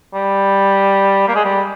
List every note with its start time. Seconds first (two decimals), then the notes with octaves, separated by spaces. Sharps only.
0.14 G3
1.28 A#3
1.36 G#3
1.45 G3